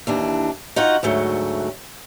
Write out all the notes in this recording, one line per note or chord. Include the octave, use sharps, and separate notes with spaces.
D#2 E3 D4
D#4 F4 F#4 F#5
D2 G#2 F#3 A3